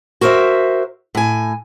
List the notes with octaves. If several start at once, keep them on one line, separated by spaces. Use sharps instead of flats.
F#4 A#4 C5 D#5 E5
A2 G#5